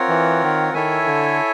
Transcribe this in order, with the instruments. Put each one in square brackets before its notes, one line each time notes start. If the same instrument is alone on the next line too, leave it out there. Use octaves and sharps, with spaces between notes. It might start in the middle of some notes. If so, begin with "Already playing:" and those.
Already playing: [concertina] C4 F4 A#4 C#5 F#5
[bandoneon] E3
D#3
[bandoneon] D#3 [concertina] E4 A4 C#5 E5 G#5
[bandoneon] D3